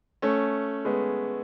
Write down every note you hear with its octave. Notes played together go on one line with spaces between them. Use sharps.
A3 C#4
G#3 B3